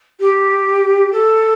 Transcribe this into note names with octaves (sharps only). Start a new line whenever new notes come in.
G4
A4